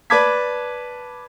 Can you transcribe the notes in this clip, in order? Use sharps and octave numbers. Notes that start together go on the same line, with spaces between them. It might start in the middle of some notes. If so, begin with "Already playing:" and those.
B4 D5 A5 D6 G#6 B6